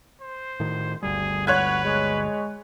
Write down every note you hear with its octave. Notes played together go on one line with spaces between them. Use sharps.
C5
A2 D#3
G1 D2 G3 G#4
B4 C#5 F#5 F#6 G#6
G#3